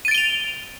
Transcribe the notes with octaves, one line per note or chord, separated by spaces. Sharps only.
A6 D7 D#7 F7 G7